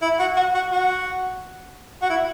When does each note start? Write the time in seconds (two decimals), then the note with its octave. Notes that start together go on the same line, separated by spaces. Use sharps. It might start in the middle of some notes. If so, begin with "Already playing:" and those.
0.02 E4
0.19 F#4
0.37 F#4
0.54 F#4
0.71 F#4
2.02 F#4
2.10 E4